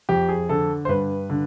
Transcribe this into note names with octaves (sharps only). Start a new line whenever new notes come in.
F2 G4
G#4
D3 A4
C5
G2 B4
D3